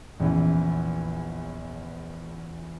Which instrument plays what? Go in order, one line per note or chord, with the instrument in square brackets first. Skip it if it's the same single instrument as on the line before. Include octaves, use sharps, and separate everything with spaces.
[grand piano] A#1 E2 C#3 E3